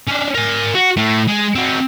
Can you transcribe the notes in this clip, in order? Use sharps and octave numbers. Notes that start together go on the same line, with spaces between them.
C#4 D4
A#4 G#5
F#4
A2 A3
G#3
C4 F#4